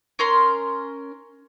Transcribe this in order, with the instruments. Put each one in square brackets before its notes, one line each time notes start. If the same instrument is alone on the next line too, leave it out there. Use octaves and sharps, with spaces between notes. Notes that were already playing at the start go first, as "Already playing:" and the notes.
[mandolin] C#4 A#4 C6